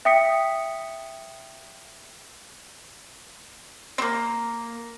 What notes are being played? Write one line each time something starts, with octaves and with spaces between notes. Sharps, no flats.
E5 G5 D#6 B6 C#7
A#3 C4